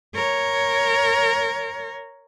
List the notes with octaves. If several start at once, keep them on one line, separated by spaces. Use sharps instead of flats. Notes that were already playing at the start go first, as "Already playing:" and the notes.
A#4 C#5